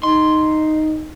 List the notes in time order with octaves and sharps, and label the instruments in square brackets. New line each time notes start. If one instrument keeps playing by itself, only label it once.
[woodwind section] D#4 [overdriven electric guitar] C6